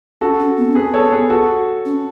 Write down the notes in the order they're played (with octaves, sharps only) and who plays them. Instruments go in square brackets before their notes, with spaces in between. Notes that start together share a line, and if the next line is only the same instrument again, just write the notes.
[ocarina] C#4 [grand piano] F#4 A4
[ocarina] C#4
B3
C#4
[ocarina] B3 [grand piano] G#4 B4
[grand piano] A4 C#5
G#4 B4
F#4 A4
[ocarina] C#4